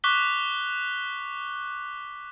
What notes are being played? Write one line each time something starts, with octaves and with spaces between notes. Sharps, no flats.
C#6 D6 F#6 B6 G7